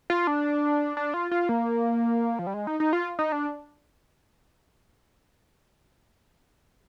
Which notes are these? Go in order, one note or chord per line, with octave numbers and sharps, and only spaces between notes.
F4
D4
D4
F4
F4
A#3
F3
G3
G#3
D#4
D#4
F4
D#4
D4